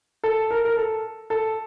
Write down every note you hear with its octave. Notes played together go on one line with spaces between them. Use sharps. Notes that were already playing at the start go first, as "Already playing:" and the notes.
A4
A#4
A#4
A4
A4